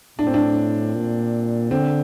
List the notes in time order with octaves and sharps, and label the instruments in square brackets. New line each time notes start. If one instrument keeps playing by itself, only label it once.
[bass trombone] A2 [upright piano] D4
[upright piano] C4
D4
[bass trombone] A#2
[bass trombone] D3 [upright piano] C4